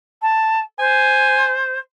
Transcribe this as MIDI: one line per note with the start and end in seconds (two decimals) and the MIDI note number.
0.22 0.60 81
0.79 1.79 72
0.79 1.56 80